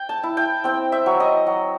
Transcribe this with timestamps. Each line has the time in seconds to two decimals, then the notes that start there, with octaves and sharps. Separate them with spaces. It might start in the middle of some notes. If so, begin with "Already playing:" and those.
Already playing: G5
0.09 A5
0.23 E4
0.37 G5
0.64 C4 G5
0.92 E5
1.06 F#3
1.20 D#5
1.47 F#3